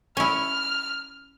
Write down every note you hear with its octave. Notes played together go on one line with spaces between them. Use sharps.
C#4 E4 F6